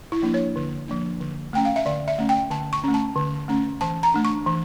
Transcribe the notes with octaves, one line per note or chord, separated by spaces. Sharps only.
E4
F3 A#3 D4
C#5
D3
F3 A#3 D4
D3
A3 C#4 G5
F5
E5
D3 D5
E5
A3 C#4
G5
D3 A5
C#6
A3 C#4
A5
D3
A3 C#4
E3 A5
A#5
A3 D4
C#6
E3